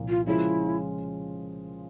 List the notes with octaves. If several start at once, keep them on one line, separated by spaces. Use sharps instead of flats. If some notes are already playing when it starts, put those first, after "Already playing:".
Already playing: C2 A#2 F3
F4
C#3 F3 G#3 C#4 E4 F4